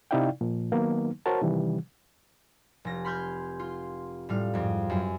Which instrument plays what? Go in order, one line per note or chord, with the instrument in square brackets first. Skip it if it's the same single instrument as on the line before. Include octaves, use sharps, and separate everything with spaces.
[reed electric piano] C3 D#4 E4 D5 F5 G5
A#2 F3
D#3 F#3 A#3 B3 D#4
F#4 A#4 C5 C#5 A5
C3 D#3 E3 G3
[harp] F1 A#6
B5 C6 F6 G6 G#6
F4 C6
A2 G3 F5
F2 G#2
F#2